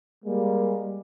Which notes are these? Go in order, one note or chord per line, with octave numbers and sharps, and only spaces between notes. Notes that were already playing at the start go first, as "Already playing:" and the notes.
G3 G#3 A#3